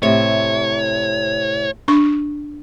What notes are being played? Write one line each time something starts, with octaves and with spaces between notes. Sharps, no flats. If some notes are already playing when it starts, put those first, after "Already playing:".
A2 C3 C#5
D4 C#6